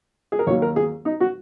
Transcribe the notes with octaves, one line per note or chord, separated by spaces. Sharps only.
G#4
A#4
D#2 D#3 F#3 A#3 C#5
A#4
G#4
D#4
F#4